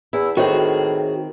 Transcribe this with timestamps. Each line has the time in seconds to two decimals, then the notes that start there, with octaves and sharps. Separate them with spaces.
0.13 E2 E4
0.37 A2 D#3 C4 F#4 G#4